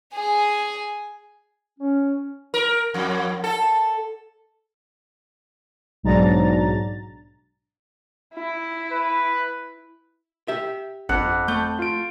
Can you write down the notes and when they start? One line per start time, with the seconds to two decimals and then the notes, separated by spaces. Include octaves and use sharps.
0.15 G#4 G#5
1.79 C#4
2.54 A#4
2.94 F2
3.44 A4
6.03 B1 G#2 F#3 D4 A#5 A6
8.34 E4
8.92 B4
10.48 G4 E5
11.09 G1 F2 F#5
11.48 A3 G6
11.79 F4 D7